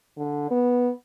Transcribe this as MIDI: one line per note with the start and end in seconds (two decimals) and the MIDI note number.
0.17 0.47 50
0.50 0.91 59